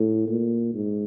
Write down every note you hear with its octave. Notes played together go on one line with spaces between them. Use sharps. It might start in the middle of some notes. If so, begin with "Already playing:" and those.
Already playing: A2
A#2
G#2